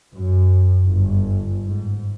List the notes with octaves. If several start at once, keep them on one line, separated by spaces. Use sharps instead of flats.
F#2
G1
G#2